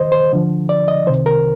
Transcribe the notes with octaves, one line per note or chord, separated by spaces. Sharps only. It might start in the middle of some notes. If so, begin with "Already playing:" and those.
Already playing: D#2 D#3 C5 D#5
C5
D2 D3 F3
D5
D#5
C2 C3 D#3 C5
A#4